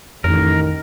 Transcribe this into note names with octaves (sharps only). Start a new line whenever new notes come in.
A1 F2 D#3 A#4